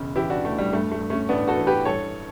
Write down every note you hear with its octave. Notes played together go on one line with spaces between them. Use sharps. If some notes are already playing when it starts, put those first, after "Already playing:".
Already playing: E1 C#3
E3 E4 G4
D4 F#4
D2 A3
G3
G2 A3
A3
G2
A3 C#4
A1 B3 D4
F#4 A4
E3
G4 B4
G2 A4 C#5